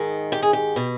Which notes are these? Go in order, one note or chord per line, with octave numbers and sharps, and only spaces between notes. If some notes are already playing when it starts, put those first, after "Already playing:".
Already playing: G#2 D#3
G4
G#4
G4
B2